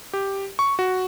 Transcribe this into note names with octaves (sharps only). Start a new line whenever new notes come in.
G4
C#6
F#4